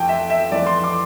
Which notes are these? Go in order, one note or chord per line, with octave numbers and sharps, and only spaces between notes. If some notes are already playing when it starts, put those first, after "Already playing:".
Already playing: F2 E3 A3 G5 A5
E5
E5
F2 E3 A3 D5
C6
D6